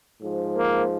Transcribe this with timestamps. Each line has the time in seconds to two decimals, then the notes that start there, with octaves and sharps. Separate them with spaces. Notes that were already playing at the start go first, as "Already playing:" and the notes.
0.21 G#2 F3
0.57 A#3